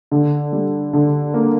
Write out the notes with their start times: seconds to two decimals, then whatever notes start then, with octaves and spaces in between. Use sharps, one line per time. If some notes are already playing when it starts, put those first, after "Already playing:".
0.11 D3
0.52 G3
0.93 D3
1.34 A#3